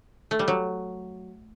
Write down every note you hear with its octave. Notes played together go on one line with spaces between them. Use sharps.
A3
G3
F#3